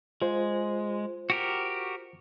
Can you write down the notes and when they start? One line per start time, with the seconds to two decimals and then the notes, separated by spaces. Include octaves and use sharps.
0.22 G#3 F4 C5
1.30 F#4 G4 A#4